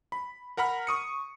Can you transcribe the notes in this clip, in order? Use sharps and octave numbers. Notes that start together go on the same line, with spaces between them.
B5
A#4 F#5 A#5 B5 F6
C#6 D#6 C#7